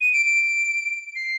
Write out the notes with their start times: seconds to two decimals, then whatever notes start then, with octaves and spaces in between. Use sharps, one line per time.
0.01 D#7
0.13 D7
0.26 D7
1.15 C7